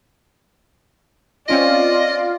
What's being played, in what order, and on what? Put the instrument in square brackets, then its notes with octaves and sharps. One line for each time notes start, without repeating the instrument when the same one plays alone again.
[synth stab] C4 C#4 D7 [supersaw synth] F4 [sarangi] D5 [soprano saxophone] D#5